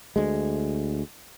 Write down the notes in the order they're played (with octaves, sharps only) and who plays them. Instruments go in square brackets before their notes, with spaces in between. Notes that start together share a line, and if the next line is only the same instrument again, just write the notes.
[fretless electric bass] D2 G#3